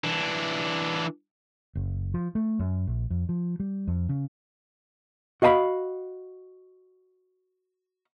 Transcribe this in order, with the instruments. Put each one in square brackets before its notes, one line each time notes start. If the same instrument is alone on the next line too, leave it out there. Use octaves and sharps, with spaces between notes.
[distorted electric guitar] E3 D4
[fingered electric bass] F#1
F3
A3
F#2
A#1
F2
F3
G3
F2
C#3
[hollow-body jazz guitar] F#4 D#5 F5 G#5 B5